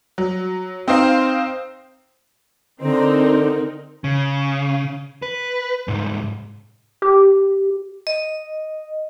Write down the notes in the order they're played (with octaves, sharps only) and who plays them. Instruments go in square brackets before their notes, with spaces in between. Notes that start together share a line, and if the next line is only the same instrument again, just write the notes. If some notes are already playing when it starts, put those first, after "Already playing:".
[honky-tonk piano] F#3
C4 D#4 C5 F5 G5
[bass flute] D3 [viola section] C4 D#4 A#4
[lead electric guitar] C#3
B4
C2 G#2
[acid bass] G4
[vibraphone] D#5